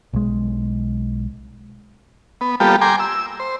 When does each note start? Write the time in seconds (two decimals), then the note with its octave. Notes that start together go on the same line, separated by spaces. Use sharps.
0.13 B1 G#3
2.41 B3
2.60 G3 A#3 B3 F4 G4 A4
2.81 G5 G#5 A#5 C6 D6
3.00 E6
3.40 C5